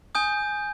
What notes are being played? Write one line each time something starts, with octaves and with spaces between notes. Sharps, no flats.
G#5 D#6 G6